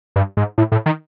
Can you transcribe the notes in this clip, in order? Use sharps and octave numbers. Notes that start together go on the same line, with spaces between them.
G2
G#2
A2
A2
D#3